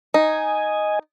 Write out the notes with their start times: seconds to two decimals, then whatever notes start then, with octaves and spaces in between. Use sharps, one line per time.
0.14 D#4 D#5 G#5